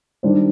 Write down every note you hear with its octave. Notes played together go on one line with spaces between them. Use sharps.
D#3 G3 D4 G4 C5